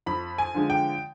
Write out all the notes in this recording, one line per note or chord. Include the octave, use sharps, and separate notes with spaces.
F2 B5
G#5
D3 F3 G#3
G5